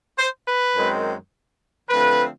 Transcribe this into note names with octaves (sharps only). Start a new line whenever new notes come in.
C5
B4
F#2 D#3 G#3 C4
D3 F3 A3 C4 B4